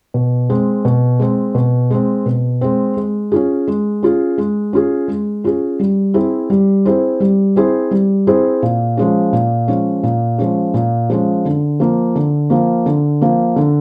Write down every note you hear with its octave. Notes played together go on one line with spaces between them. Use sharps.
B2
G#3 C4
B2
G#3 C4
B2
G#3 C4
B2
G#3 C4
G#3
C#4 F4 G#4
G#3
C#4 F4 G#4
G#3
C#4 F4 G#4
G#3
C#4 F4 G#4
G3
C4 E4 G#4 C5
G3
C4 E4 G#4 C5
G3
C4 E4 G#4 C5
G3
C4 E4 G#4 C5
A#2
F3 G#3 C#4
A#2
F3 G#3 C#4
A#2
F3 G#3 C#4
A#2
F3 G#3 C#4
D3
F3 A#3
D3
F3 A#3
D3
F3 A#3
D3